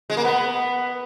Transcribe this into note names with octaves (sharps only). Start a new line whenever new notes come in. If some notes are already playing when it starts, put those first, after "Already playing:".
G#3
A#3
B3